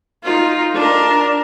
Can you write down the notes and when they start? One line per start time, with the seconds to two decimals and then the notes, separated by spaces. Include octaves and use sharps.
0.24 D#4 F4
0.74 D4 A#4